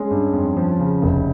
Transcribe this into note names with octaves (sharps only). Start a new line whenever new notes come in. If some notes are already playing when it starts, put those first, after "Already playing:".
Already playing: G#3 C#4
G2
F2
F3
C#3
F1